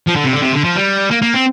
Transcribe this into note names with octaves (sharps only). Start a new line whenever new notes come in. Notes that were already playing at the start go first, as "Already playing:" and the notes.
F3
D3
C3
D3
C3
D3
F3
G3
A#3
A#3
C4